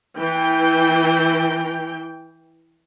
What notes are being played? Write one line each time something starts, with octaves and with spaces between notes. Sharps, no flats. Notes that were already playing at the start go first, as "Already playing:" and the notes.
E3 G5